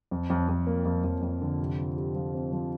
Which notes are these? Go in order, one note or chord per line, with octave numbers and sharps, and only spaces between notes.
F2
F2
F2
A#3
F2
F2
F2
D3
C3
F3
G4
F3
C4
F3